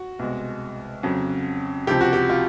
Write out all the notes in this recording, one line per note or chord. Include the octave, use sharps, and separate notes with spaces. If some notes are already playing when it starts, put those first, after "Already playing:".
Already playing: F#4
C2 B2 G#3
F2 C#3 F#3
C#2 C3 F3 G4
F#4
G4
F4